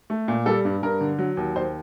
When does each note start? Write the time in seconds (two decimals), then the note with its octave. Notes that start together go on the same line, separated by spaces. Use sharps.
0.10 A3
0.28 A#2
0.46 G3 A4
0.65 G2
0.83 G2 A#4
1.01 D3
1.19 F#3
1.37 D#2
1.56 D#2 C5